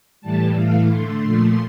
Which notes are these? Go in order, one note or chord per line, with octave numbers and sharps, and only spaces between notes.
A2 E3 G3 A5
A2 E3 A3 F5
D3 A3 C6
A#2 F3 A3